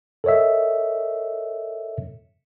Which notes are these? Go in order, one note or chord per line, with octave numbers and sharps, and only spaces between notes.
A4 A#4 C#5 D#5 E5